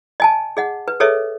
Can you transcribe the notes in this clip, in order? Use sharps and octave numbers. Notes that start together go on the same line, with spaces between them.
D#5 G#5 A5
G#4 D#5 F#5
B4
G#4 A4 B4 C#5 D#5 E5